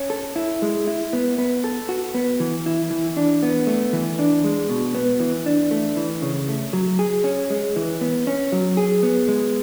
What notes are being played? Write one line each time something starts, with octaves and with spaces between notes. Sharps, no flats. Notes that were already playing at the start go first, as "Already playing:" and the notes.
Already playing: C#4
A4
E4
G#3
E4
B3
B3
A4
F#4
B3
E3
E4
E3
D4
B3
A3
E3
D4
G#3
B2
B3
E3
D4
A3
E3
C#3
A3
F#3
G#4
C#4
G#3
E3
B3
C#4
F#3
G#4
B3
G#3